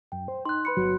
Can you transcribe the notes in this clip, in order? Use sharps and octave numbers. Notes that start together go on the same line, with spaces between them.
F#2 G5
C5
D#4 C6 F#6
B4 B5 C#7
G1 F#3 F#4